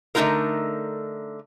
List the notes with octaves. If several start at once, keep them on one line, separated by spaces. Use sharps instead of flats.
D3 A3 C4 D#4 F4 A#4